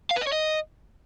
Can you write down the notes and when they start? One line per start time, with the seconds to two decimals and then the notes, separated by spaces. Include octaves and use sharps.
0.11 F5
0.16 B4
0.22 D#5
0.27 C#5
0.33 D#5